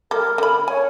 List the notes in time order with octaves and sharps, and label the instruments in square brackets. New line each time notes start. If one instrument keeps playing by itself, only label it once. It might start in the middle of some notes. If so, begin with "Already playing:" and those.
[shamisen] G3 A4 [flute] A#4
[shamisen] D3 B5
[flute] C#5 [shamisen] G#5